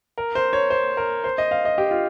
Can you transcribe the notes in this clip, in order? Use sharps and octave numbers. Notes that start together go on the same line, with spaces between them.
A#4
C5
C#5
C5
A#4
C5
D#5
F5
D#5
G4
F4